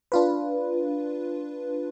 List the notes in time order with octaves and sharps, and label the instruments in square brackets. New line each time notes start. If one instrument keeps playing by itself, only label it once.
[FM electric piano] D4 F4 B4